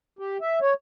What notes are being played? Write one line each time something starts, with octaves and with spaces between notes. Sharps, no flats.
G4
E5
C#5